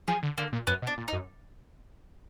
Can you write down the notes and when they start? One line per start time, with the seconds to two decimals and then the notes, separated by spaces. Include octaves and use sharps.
0.08 F3 G#4
0.23 D3
0.38 D3 A#3
0.53 A#2
0.67 F#2 B3
0.82 B2
0.87 D4
0.98 A#2
1.08 D#4
1.13 F#2